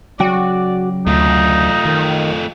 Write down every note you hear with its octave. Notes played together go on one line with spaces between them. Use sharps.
C#3 F#3 F#4 D5 G5
D2 A3 D#4 F4
D#3